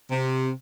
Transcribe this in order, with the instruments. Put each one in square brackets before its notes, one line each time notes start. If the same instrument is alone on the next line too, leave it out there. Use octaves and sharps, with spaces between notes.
[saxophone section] C3